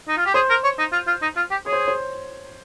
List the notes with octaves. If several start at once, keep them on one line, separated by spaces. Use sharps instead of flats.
D#4
F4
G4
G#4 C5
A#4
C#5
D#4
F4
F4
D#4
F4
G4
G#4 C#5
C5
C5